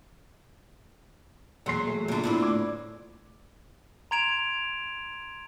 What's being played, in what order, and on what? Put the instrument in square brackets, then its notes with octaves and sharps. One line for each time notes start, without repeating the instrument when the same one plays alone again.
[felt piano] E1 C6 C7 [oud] F#3 [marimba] A#3
[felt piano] A3 G#4
[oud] D3 F#3 [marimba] A#3 B3 F4
[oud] D2 A2 D3 [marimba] D4 E4 B5
[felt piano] D6 [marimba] E6 G#6
[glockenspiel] A#5 C6 G#6 D7 E7 F7